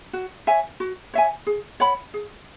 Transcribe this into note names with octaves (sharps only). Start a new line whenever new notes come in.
F#4
C#5 E5 G#5
F#4
C#5 E5 G#5
G#4
C#5 F#5 B5
G#4